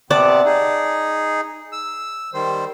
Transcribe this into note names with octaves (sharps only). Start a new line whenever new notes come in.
C3 B3 C4 D5 F#5 A5
D#4 G#4
E6
D#3 G3 C5